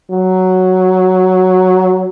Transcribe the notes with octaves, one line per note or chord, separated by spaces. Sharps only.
F#3